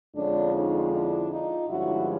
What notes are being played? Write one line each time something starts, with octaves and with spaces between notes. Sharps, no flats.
F2 D3 F3 G#3 C#4 D4
C#4 D#4
D4 E4
D#4 F4
G2 D3 F3 G#3 C#4 E4 F#4